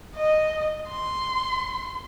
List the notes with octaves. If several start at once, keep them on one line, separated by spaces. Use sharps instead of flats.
D#5
C6